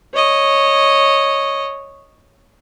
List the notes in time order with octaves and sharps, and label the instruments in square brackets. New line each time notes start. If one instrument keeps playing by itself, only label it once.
[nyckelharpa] C#5 D#5